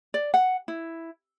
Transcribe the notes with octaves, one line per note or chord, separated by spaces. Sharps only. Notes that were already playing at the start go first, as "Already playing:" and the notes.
D5
F#5
E4